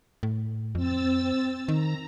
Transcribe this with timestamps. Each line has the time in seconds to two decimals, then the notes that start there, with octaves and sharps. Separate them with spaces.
0.23 A2
0.75 F2 C4 E6 A6
1.68 D#3 A#5